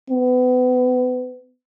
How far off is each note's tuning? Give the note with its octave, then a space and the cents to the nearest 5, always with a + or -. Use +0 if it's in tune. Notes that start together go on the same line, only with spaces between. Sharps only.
B3 +30